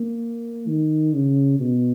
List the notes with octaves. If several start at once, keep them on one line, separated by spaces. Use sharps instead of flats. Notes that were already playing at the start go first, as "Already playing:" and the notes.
Already playing: A#3
D#3
C#3
B2